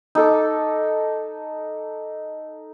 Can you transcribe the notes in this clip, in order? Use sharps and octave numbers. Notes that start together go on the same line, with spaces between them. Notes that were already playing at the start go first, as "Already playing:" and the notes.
D#4 A4 D6